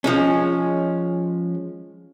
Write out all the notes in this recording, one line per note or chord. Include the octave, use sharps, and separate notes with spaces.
F3 G#3 C#4